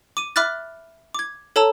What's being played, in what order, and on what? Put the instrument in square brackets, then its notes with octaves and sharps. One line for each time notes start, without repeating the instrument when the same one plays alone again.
[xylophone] D6 D#7
E5 B5 D6 F6 F#6 A6
D6 G#6
A4 C#5 A5 A#5 E6